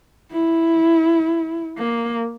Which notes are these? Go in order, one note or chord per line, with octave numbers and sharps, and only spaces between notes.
E4
A#3